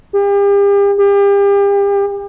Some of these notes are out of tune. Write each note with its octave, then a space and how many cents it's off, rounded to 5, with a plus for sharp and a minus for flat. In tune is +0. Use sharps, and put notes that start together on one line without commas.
G4 +40
G4 +35